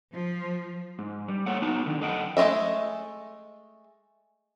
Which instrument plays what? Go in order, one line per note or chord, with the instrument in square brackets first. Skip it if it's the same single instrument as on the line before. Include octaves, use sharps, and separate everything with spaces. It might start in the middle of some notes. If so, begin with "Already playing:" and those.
[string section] F3
[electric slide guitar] G#2
G3
A3 A#3 A4 C#5 F#5
F#3 B3 D#4 A5
D3 D#3
F#2 A4 D#5 F#5 G5 A5
[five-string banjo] G#3 A3 F4 D#5 E5